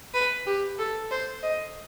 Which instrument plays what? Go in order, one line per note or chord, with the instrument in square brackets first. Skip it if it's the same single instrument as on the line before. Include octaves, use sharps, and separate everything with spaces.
[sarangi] B4
G4
A4
C5
D#5